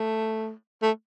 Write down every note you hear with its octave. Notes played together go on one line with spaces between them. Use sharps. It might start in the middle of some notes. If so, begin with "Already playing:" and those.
Already playing: A3
A3